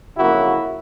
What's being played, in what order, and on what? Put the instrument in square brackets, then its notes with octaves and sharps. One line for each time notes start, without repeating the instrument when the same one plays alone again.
[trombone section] F2 C#3 F#3 A#3 E4 F#4